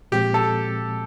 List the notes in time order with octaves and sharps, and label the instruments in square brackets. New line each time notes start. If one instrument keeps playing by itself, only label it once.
[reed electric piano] A#2 F3 G#3 C4 [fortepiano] G4
[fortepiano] A4